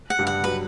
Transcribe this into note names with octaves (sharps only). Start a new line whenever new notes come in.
F#5
G2 G3
F#5
F#3 B4